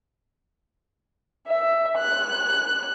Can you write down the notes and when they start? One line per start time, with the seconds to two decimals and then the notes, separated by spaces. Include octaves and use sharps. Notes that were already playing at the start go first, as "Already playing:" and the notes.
1.48 E5
1.98 F#6